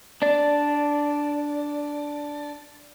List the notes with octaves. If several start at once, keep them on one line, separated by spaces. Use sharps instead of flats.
D4 D5